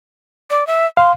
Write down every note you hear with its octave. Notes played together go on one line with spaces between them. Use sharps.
D5
E5
F5 C6